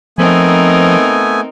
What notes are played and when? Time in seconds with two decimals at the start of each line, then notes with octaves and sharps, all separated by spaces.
0.18 F3 A3 B3 C4 D#4 A#4 G#5